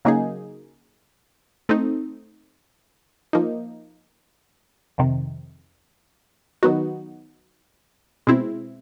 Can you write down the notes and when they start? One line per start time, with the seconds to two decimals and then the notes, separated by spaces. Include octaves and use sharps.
0.05 C#3 F#3 A#3 D#4 G#4
1.69 A3 C4 D#4
3.33 F3 A#3 D#4
4.98 F2 C3 D#3
6.63 D#3 F#3 B3 D#4 F#4
8.27 B2 G#3 C4 E4